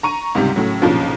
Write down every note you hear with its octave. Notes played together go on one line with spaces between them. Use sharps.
A#5 C#6 D#7
C#2 G#2 C3 G3
A2 C#3 F#3
B1 G2 A#2 C#3 F3